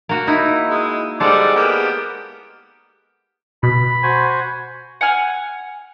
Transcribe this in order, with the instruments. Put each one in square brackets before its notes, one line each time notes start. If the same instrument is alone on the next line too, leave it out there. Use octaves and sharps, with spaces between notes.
[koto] A#3 F#4
D#4 E4
[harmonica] G#3
[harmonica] G3 D5 F#5 [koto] G#3 A4 C5
[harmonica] A#3 B3 G4
[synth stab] B2 [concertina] B5
[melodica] F#4 C5 G#5
[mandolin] F#5 G#5 F6